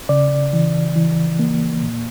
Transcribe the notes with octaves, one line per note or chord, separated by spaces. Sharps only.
C#3 D5
E3
E3
A#3
A#2